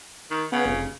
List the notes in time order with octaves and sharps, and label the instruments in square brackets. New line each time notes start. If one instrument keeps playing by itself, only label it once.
[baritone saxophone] D#3
[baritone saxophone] C#3 [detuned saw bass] B3
[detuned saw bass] F1